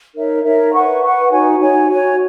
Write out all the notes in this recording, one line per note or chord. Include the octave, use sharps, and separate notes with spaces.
D#4 A#4 C#5 E5
D#4 A#4 C#5 E5
B4 F#5 C#6
B4 F#5 C#6
D#4 F#4 C#5 G#5
D#4 F#4 C#5 G#5
F#4 C#5 G#5